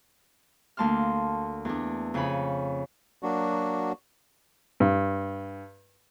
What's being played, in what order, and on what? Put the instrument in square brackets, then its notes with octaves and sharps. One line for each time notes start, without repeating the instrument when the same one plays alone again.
[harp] D2 A#3 A5 C6 F6
E2 D4
F2 C#3 C#5 G#5 B5
[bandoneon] F#3 A#3 D4 F#4
[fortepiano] G2